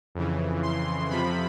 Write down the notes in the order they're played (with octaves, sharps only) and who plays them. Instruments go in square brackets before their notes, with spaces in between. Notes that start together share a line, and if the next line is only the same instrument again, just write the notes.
[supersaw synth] F2 C#3 E3
C6
F2 C3 F3 B5